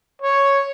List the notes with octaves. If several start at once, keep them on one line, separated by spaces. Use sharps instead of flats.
C#5